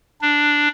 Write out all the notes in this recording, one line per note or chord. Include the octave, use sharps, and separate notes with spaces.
D4